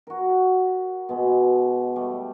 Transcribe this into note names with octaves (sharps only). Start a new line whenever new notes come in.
F#4 A#4
B2 G#3
G3 A3